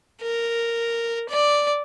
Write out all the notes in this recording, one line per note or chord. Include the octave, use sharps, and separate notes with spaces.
A#4
D5